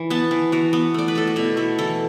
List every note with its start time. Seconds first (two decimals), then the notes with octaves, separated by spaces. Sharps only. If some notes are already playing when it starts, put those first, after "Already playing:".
Already playing: E3
0.10 B3 A5
0.31 E3
0.52 E3 F#4
0.73 B3
0.94 A3 D5
1.08 B4
1.15 A3 A4
1.27 F#4
1.36 B2 E4
1.57 A3 E4
1.79 E3 A4